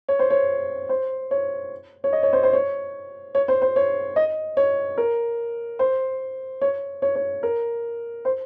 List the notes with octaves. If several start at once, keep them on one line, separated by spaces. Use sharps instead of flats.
C#5
C5
C#5
C5
C#5
C#5
D#5
C#5
C5
C5
C#5
C#5
C5
C5
C#5
D#5
C#5
A#4
C5
C#5
C#5
C#5
A#4
C5